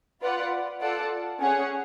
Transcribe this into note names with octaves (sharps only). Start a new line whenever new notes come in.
F4 B4 D5 F#5
F4 A4 D5 F#5 A5
C#4 G#4 C#5 F#5